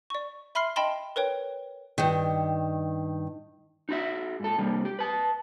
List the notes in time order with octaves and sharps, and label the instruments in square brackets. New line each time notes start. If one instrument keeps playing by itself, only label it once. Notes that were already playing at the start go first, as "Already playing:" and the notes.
[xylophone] D5 C#6
E5 B5 C6 F6 C7
D#5 G5 A5 B5 C6
A#4 B4 C#5 G5
[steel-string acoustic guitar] G2 D#3
[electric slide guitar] D#4 F#4 E5
G#2 A4
C3 G3 A#3
G4
B4 A5